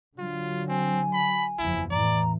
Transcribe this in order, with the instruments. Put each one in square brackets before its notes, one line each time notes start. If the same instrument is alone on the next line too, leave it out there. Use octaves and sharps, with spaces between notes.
[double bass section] D3 F#3 [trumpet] F4
[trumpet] C4 [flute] G#5
[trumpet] B5
[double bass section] F#1 E2 F3 [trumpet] E4
[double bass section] E2 A2 E3 [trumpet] D5 [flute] A#5